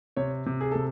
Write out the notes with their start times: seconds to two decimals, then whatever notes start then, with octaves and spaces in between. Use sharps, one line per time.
0.17 C3 C#5
0.46 C3
0.60 G#4
0.72 C3 A4